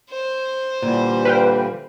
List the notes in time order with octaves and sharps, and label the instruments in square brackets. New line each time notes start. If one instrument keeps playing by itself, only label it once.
[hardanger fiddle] C5
[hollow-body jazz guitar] A#2 [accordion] D3 E3 G3
[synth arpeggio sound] B4 F5 G5